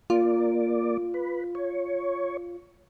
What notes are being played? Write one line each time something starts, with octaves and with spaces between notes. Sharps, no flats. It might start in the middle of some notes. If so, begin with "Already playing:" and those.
A#3 F4 D5
B4
C#5